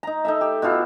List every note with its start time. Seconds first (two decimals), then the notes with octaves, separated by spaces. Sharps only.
0.03 D#4 A#5
0.25 D#4 A4 E5
0.41 G4
0.62 B2 E4 F4 A4